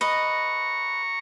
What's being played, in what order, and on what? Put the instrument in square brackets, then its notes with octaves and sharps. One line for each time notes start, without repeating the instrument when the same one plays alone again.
[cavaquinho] B4 D#5 [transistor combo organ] A#5 C#6